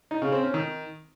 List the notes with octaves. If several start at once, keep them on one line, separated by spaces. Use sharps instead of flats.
D#4
C#3
C4
C#4
D#3